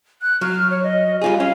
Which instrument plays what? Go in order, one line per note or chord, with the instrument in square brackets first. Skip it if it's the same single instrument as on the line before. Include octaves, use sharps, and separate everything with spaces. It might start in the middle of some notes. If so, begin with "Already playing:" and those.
[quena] F#6
[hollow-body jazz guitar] F#3 [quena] F6
[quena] C#5
D#5
[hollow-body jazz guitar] G3 F4 G#4 [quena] G#5
[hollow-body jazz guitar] C#4 [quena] F5